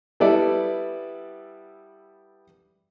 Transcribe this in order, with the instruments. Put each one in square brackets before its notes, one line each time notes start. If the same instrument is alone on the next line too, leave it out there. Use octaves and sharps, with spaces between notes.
[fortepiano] G3 B3 E4 A4 D5